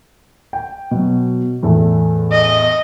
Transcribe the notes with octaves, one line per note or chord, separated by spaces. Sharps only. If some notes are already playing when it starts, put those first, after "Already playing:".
G5
B2 F#3
E2 A2 A4
D#5